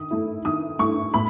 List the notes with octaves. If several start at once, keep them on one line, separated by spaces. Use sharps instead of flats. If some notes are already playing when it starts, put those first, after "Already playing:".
Already playing: D#3 D#6
A3 E4
D#3 D#6
A3 E4 C#6
A2 B5